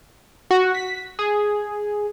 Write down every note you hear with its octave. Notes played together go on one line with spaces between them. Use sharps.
F#4
B6
G#4